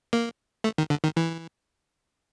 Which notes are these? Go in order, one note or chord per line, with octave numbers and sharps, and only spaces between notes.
A#3
A3
D#3
D3
D#3
E3